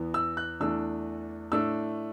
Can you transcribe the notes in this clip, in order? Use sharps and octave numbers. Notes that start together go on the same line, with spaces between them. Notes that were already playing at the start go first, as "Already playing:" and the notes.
Already playing: E2 E3 B3
E6
F#6
E2 E3 A3 D4 E6
A2 A3 D4 E6